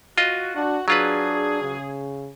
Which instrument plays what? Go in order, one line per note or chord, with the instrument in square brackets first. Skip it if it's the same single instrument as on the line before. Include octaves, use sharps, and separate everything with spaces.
[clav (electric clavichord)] F4 D#5 [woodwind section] F#4
[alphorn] D4 [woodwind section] F#4 F#5
[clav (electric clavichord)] F#3 F4 B4 [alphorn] D4 [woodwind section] G#4
[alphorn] C#3